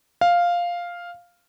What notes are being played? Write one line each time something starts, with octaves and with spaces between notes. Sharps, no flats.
F5